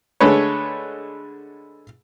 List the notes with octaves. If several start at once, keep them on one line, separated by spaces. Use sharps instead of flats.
D3 G#3 A3 B4 C#5